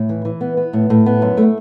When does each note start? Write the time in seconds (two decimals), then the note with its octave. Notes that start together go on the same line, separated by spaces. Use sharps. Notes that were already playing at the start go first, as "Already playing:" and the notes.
Already playing: A2
0.09 E3
0.25 E3
0.41 B3
0.57 B3
0.73 A2
0.90 A2
1.06 B3
1.22 F#2
1.37 A3